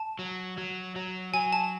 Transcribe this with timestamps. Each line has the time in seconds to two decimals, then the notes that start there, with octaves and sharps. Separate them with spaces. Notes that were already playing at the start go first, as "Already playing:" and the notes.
Already playing: A5
0.19 F#3
0.58 F#3
0.96 F#3
1.34 F#3 G#5
1.53 A5